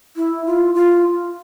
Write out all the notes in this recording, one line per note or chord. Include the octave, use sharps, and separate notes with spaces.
E4
F4
F4